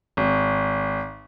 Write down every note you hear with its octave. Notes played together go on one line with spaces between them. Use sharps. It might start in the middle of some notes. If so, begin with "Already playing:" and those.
G#1